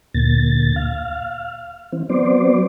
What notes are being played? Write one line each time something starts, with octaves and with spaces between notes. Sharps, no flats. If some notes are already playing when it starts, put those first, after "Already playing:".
D2 A#2 A6
F5
E3 C4
F#3 B3 C4 C5 D5